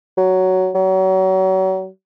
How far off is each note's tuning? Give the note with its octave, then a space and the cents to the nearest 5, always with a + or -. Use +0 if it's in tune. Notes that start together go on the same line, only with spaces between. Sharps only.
F#3 +10
F#3 +35